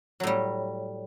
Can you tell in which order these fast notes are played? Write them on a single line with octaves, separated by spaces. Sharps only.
F#3 A2 G3